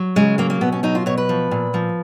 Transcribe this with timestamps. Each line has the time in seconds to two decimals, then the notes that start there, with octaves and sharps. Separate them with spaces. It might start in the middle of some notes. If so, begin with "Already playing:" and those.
Already playing: F#3
0.16 C#3 G#3
0.38 F#3 A#3
0.50 A#3
0.61 B2 B3
0.72 C#4
0.83 F#3 D#4
0.95 F4
1.06 B2 C#5
1.18 B4
1.29 F3
1.51 A#2
1.74 F3